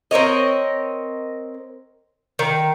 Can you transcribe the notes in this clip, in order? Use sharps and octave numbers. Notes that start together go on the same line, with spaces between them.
C4 A#4 C#5 D#5
D#3